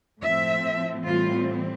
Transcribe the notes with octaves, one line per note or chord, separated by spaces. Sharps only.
A2 F3 C4 E5
A2 E3 G3 C4 F4